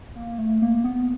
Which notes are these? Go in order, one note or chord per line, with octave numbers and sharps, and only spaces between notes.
A#3
A3
A#3
B3